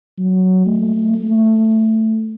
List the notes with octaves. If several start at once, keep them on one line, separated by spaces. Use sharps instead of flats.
F#3
A3
A3